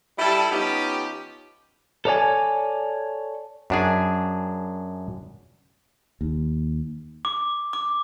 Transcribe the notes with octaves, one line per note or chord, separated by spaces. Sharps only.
G3 E4 A4
F3 B3 C#4 D#4 G4
A4 C#5 D5 G#5
F#2 D4 G#4
D#2
D6
D6